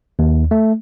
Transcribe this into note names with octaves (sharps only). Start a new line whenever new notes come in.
D#2
A3